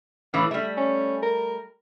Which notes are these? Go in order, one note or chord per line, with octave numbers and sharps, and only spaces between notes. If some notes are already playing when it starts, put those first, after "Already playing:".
A2 E3 E4 F5
G3 A3 E5
C#4
A#4